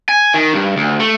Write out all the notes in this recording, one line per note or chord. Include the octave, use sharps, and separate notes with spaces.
G#5
D#3
G2
D2
A3